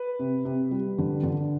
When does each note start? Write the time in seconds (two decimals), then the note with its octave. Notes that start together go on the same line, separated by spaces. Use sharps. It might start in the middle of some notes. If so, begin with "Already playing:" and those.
Already playing: B4
0.19 C3
0.45 C3
0.71 G3
0.98 D3
1.23 D3